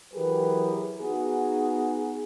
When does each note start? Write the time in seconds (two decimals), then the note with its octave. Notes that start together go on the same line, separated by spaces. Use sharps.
0.14 E3 F#3 G4 G#4 A#4 B4
0.99 B3 D#4 F#4 G#4